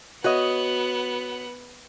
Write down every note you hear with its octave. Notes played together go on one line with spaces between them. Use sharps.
B3 F#4 C#5 D#5 F#5